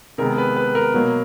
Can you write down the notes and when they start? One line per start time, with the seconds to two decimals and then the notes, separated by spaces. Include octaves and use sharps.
0.18 C3 D#3 G#3 B3 A#4
0.38 B4
0.56 B4
0.75 A#4
0.94 B2 F#3 A#3